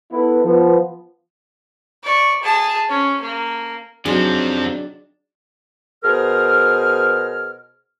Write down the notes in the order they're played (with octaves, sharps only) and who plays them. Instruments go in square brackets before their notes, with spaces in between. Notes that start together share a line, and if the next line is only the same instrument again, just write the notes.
[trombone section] B3 E4 A4 B4
F3 B3
[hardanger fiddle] D5 C#6
G#4 A5
C#4
A#3
[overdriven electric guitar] C3 [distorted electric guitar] F3 C4 [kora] F#3 D#4 G#4 [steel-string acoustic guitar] D4
[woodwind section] B2 G#4 A#4 C5 F6